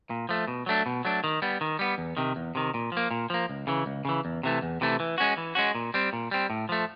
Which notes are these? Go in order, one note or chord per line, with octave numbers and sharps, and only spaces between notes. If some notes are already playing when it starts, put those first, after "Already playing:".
A#2
F3 A3
B2
F#3 A3 D4
B2
F#3 A3 D4
D#3
G3 B3
D#3
G3 B3
E2
C3 D#3
E2
C3 D#3
A#2
F3 A#3
A#2
F3 A#3
C#2
C#3 E3
C#2
C#3 E3
E2
C3 E3 A3
E2
C3 E3 A3
E3
G#3 C#4 F#4
E3
G#3 C#4 F#4
A#2
G3 C4
A#2
G3 C4
A2
F3 A3